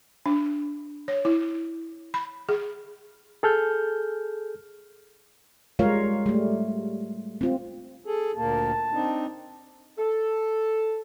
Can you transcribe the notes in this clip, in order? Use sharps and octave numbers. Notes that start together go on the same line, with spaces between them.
D4
C#5
E4
B5
G#4
G#4 A4 F6 G6
G3 G#3 F4 A#4 C#5 F5
G3 A3
C4 F4
G#4 A4
D2 A#2 A#3 A5
C4 D4 D#4
A4